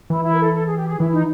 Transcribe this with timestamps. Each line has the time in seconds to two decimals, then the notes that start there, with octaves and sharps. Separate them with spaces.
0.10 E3 E4
0.24 E4
0.32 A#4
0.40 A4
0.54 A4
0.65 G#4
0.77 G4
0.88 G#4
1.00 E3 E4
1.12 D#4